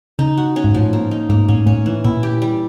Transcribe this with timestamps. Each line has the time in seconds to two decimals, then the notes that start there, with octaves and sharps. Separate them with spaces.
0.19 C#3 D#4
0.37 F#4
0.56 C#4
0.64 G#2
0.74 A2 F3
0.93 A#3
1.11 D#4
1.29 G#2 A#3
1.48 A2 C#4
1.66 A2 C#4
1.86 E3
2.04 A#2 E4
2.23 G4
2.42 G3